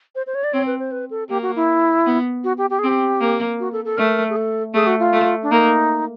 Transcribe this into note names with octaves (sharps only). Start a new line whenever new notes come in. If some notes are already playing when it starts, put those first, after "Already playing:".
C5
C5
C#5
D5
C4 C#5
B4
C5
B4
A4
A#3 G4
F#4
E4
B3
F#4
G4
G4
G#4
C4 G4
A#3
F#4
A4
A4
A3 A#4
G#4
A4
A3 G#4
F#4
F4
A3
D4
A#3 D#4